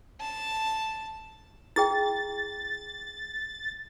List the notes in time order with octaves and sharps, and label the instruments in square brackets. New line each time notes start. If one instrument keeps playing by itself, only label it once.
[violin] A5
[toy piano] E4 G#4 G5 [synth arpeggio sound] A6